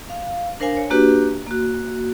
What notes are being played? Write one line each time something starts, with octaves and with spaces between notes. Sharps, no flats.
F5
D4 A#4 C5 F5 G#5
C#5
A#3 D4 F#4 G4 B4
A#3 F#4